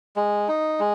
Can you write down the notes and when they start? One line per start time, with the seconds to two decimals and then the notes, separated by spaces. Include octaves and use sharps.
0.16 G#3
0.48 D#4
0.79 G#3